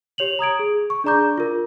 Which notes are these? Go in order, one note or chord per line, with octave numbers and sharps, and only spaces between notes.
G4 C#5 F7 F#7
A#5 D#6 G#6 D7
G#4
C#6
D4 G#4 D5 A#5 D6 G6
F4 A#4